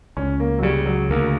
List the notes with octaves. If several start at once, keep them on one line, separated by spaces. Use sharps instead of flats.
C#2 C#4
A#3
F#3
C#3 G3
F#3
D2 A#3